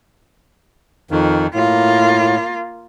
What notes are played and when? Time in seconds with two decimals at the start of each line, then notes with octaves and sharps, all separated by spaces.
1.11 F2 D#3
1.55 A2 A#3 F4